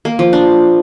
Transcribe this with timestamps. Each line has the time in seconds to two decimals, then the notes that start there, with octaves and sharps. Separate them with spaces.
0.05 A#3
0.19 F3
0.33 D4